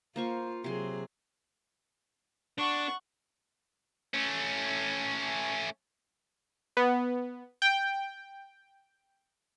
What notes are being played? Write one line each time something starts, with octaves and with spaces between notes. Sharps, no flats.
A#3 F4 C5 C#6
C3 F#3 G#4 C6
D4 F#5 C#6
A3 C#4
B3
G5